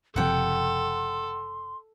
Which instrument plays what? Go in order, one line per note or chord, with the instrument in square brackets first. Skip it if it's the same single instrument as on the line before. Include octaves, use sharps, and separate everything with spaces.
[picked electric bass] F#1 C3 F3 [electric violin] A4 [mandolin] F#5 G5 [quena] C6